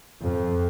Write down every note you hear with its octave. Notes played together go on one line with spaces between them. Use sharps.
F2